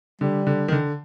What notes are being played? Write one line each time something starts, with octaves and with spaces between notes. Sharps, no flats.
D3 G3
D3
D#3
D3